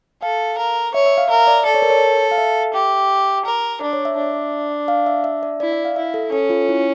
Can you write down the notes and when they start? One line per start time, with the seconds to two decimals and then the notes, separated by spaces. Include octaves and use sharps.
0.22 A4 F5
0.58 A#4
0.94 C#5 E5
1.06 E5
1.18 F5
1.29 A#4 E5
1.47 D5
1.65 A4 D5
1.75 C#5
1.82 A#4
1.90 C#5
2.31 F5
2.38 E5
2.74 G4
3.45 A#4
3.81 D4 D5
3.93 C#5
4.05 E5
4.17 D4
4.88 F5
5.06 E5
5.24 E5
5.43 D5
5.60 E4 D5
5.72 E5
5.85 F5
5.96 E4 E5
6.14 A4
6.32 C#4 A4
6.50 F4
6.69 E4